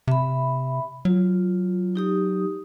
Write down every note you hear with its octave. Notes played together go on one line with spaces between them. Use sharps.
C3 E5 B5
F#3 F4
D#4 G4 D#6